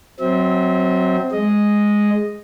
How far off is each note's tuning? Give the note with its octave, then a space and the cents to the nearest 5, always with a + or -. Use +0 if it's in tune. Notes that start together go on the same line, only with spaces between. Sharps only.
F#3 +0 C4 +0 E5 -40
G#3 +0 D#5 +0